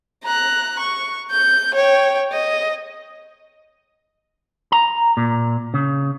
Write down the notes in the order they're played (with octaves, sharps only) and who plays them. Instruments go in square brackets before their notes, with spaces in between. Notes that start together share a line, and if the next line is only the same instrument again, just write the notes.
[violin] A#5 F#6
C#6
G6
C#5 G5
D#5
[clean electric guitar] A#5
A#2
C#3